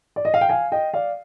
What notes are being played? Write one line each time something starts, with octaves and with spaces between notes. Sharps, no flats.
D5
D#5
F5
G5
F5 G#5
D#5 G5
D5 F5